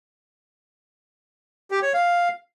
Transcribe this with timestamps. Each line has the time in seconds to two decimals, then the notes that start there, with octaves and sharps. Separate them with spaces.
1.71 G4
1.82 C#5
1.94 F5